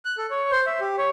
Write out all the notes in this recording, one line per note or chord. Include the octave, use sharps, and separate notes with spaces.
F#6
A4
C#5
C5
E5
G4
C#5